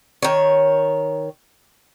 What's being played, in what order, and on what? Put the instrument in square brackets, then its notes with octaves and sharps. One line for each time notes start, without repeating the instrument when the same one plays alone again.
[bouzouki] D#3 C#5